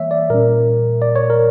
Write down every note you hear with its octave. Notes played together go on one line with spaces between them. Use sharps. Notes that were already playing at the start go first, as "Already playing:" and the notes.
Already playing: E3 G3 A#3 C#5 E5
D5
A#2 G3 C#4 A#4
D5
C#5
A#4